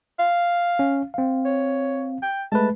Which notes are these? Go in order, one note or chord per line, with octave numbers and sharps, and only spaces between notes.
F5
C#4
C4 F5
C#5
G5
G#3 A3 B4 A5